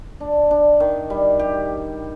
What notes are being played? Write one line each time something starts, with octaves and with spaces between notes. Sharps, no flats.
D4
D4
D#3
G3
G4